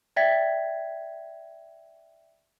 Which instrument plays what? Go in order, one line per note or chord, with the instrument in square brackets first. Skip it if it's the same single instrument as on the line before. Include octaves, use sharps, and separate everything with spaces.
[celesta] D5 E5 G5 G#6 A6 B6